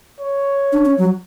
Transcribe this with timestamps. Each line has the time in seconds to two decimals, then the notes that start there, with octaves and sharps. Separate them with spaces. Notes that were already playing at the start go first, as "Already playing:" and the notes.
0.20 C#5
0.72 D4
0.85 C#4
0.98 F#3